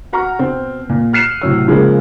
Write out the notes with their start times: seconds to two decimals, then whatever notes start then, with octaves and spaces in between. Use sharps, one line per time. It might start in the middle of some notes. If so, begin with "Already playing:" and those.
0.13 F#4 F#5 A#5 C#6 F6
0.39 B2 C4
0.89 A#2
1.13 F6 F#6 C7 C#7 D#7 E7
1.41 A2 C3 F#3 C#5 E6
1.67 C#3 F3 G#3 A#3